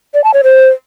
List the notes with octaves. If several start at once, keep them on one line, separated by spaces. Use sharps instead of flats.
D5
A5
C#5
C5